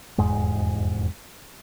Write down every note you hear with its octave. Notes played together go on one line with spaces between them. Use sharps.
F1 E2 G#2 G#3